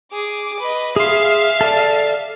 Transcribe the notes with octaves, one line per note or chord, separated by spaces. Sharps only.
G#4 D6
B4 D#5
G#4 E5 F5 C6
A4 D5